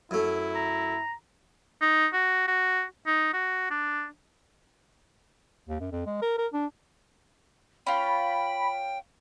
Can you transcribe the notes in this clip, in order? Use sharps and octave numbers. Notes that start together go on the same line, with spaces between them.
F#2 A3 E4
A#5
D#4
F#4
F#4
D#4
F#4
D4
D#2
F#2
F2
G#3
A#4
A#4
D4
C#4 F4 G5 B5